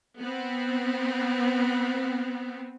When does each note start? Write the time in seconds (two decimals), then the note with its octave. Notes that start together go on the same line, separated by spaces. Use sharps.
0.18 B3 C4